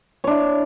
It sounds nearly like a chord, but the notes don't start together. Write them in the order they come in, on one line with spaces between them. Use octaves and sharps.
C#5 D4 E4